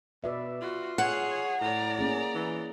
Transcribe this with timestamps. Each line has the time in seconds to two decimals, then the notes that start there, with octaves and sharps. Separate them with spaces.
0.24 B2 B4 D5 E5
0.61 F4 F#4
0.98 G#4 C#5 F#5
1.61 A2 D5 A#5
1.99 A#3 C#4 G#4
2.35 E3